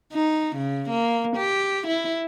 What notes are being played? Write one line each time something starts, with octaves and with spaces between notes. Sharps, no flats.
D#4
C#3
A#3
G4
E4